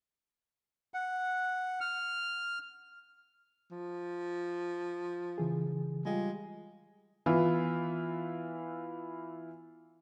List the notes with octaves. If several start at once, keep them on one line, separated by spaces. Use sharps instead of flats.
F#5
F6
F3
C#3 E3 G#4
G3 G#3 F4 G4
E3 B3 E4 F4